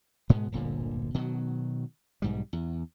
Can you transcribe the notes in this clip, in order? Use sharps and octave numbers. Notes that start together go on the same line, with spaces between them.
G#2 B2 G#3 B3
D1 G1 A#2 D3
B2 D#3 F#3
B1 G#2 G3
E2